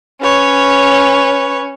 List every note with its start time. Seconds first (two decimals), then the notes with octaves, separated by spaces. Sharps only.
0.22 C#4 B4 C#5